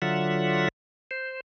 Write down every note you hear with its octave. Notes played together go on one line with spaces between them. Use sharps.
D3 F#3 F4 E5 F#5
C5